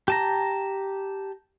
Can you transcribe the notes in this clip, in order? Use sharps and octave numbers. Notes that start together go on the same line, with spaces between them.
G4 A5 A#5